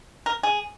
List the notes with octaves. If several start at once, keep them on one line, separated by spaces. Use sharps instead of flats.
A#4
G#4